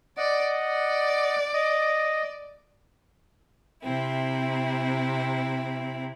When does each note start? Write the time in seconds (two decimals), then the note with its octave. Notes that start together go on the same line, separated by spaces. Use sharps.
0.17 D5 D#5 F#5
0.56 D5
1.53 D#5
3.82 C3 C4 E4